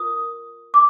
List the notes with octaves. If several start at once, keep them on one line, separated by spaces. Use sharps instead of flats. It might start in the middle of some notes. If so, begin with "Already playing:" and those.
Already playing: F4 A#4 D#6
D6